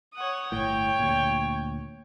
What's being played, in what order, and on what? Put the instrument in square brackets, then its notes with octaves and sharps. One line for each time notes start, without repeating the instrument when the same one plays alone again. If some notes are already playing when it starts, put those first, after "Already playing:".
[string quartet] C#5 F#5 D#6
[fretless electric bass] G1 A2 [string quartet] C#5 G5
[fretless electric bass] D2 A#2